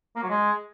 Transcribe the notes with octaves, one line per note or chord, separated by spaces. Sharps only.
A#3
F#3
G#3